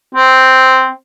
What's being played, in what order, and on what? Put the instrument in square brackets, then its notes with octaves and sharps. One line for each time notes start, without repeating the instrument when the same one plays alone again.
[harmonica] C4